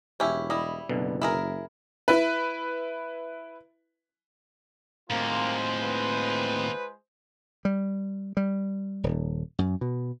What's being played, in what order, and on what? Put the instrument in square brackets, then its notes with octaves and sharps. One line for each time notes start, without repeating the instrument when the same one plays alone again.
[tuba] E1 [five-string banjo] C#4 E4 [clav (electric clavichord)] G4 E5
[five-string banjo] G3 E4 [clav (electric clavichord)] D#5
[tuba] F#1 [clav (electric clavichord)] B1 B2 D3
[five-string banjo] E4 G#4 A#4
[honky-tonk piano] E4 B4
[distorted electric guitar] D#2 [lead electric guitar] A2 C4 [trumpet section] G#3 F4 C5 [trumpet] A#3
[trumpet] B4
[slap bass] G3
G3
D#1
F#2
B2